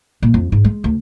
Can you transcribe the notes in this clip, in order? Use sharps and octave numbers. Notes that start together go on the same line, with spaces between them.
A#2
F2
G#2
G#3
D2